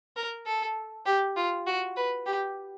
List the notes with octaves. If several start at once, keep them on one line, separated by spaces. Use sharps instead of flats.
A#4
A4
G4
F4
F#4
B4
G4